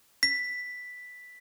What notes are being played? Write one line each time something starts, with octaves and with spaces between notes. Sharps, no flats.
B6